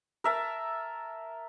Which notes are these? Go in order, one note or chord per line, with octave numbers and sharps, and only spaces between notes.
A#4 E5 A5